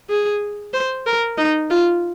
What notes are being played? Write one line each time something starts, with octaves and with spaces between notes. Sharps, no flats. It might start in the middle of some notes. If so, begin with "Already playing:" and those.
G#4
C5
A#4
D#4
F4